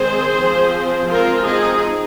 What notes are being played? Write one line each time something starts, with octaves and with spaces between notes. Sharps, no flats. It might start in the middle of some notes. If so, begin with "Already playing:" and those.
Already playing: D#3 G#3 C4 G#4 C5
F3 C4
F3 G#3 C4 F4 A#4
D#4 G#4